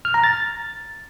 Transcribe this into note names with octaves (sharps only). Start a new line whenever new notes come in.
F6
A#5
A6